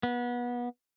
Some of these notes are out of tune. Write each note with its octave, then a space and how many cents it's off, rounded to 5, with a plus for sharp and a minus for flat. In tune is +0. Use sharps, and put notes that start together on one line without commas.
B3 -25